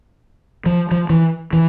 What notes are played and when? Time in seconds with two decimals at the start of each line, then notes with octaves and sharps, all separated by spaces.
0.66 F3
0.91 F3
1.10 E3
1.53 E3